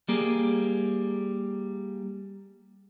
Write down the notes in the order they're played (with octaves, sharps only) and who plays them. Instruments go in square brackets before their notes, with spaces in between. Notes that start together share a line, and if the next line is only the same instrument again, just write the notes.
[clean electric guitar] G3 A#3 G#4